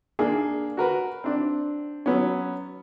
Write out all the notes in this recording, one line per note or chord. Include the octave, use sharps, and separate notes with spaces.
A#3 D4 G#4
F#4 A#4 B4
C4 D4
F#3 B3 C#4